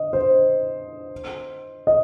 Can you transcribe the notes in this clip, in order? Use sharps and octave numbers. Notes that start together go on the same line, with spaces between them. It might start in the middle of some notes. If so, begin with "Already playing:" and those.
Already playing: D#5
C5
D#5